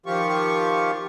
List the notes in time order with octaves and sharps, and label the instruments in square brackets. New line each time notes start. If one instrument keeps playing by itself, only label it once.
[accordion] D#3 F3 F4 G4 C#6